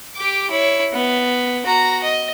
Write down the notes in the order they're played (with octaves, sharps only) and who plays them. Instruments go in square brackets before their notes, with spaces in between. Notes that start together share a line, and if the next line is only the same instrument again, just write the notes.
[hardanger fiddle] G4 D6
E4 C#5
B3
F#4 A#5
D#5